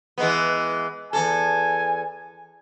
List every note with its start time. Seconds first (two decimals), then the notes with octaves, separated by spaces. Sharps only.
0.18 E3 G#3 B3
1.13 E2 D#3 A4 G#5